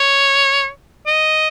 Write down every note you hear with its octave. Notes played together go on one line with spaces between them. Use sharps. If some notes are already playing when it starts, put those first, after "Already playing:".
Already playing: C#5
D#5